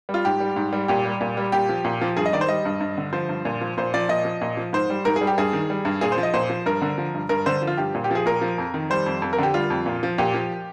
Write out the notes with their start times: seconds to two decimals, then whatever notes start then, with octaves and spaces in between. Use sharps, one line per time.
0.09 G3
0.14 F4
0.25 G#2 G4
0.40 G3
0.56 G#2
0.73 G3
0.88 A#2 G4
1.05 G3
1.21 A#2
1.37 G3
1.52 A#2 G4
1.69 F3
1.85 A#2
2.01 F3
2.17 G2 G#4
2.26 D#5
2.33 D#3 D5
2.41 C5
2.49 G3 D#5
2.65 G2
2.81 G2
2.98 D3
3.13 F3 C5
3.29 G2
3.45 A#2
3.61 F3
3.77 A#2 C5
3.94 F3 D5
4.09 A#2 D#5
4.25 F3
4.41 A#2
4.57 F3
4.73 G#2 C5
4.90 G3
5.05 G#2 A#4
5.16 G#4
5.21 G3
5.27 G4
5.38 G2 G#4
5.53 D#3
5.70 G3
5.85 G2
6.01 A#2 G#4
6.12 C5
6.18 F3
6.23 D#5
6.34 A#2 C5
6.50 F3
6.66 G2 A#4
6.82 D3
6.98 F3
7.14 G2
7.29 G2 A#4
7.46 D3 C5
7.62 F3
7.67 F4
7.77 G2 G4
7.95 A#2
8.04 G4
8.11 F3 G#4
8.26 A#2 A#4
8.42 F3
8.58 F2
8.74 D#3
8.90 G3 C5
9.06 F2
9.22 F2
9.33 A#4
9.39 D3 G4
9.54 G3 F4
9.70 F2
9.86 A#2
10.03 F3
10.18 A#2 G4
10.34 F3